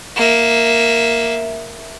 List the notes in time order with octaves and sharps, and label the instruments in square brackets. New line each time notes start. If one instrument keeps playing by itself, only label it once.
[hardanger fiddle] A#3 E5